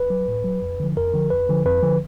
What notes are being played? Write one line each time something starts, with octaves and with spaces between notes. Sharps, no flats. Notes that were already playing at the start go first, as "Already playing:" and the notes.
Already playing: B4
F#3
A2
F#3
F2
D3 F3
F2 A#4
D3 F3
F2 B4
D3 F3
F2 B4
D3 F3